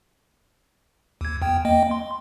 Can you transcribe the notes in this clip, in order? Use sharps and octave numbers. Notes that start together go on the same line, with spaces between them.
D#2 G#6
E2 G5
A#3 D#5 G5
C6